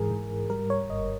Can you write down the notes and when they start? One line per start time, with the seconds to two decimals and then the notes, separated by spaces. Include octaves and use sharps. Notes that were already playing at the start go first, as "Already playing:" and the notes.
Already playing: G#2 E3 G#4 A#4
0.11 G#2
0.50 G3 A#4
0.70 C#5
0.90 G1 D#5